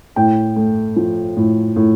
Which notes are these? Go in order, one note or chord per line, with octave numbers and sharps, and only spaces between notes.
A2 G5
A3
F3
A2
A2